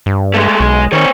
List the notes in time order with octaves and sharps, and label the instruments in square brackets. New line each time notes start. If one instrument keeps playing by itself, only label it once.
[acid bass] G2
[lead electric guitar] G#3 A3
[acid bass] B1 [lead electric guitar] G#3
[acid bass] D#3 [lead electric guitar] C4 C#5